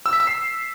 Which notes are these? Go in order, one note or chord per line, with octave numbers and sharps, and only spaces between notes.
E6
B6
E6
C7